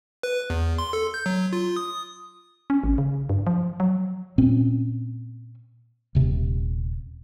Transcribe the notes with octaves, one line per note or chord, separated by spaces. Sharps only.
B4
E2
C6
A4
G6
F#3
F4
D#6
C#4
G#1
C#3
G2
F3
F#3
A#2 C4 C#4
D#1 C3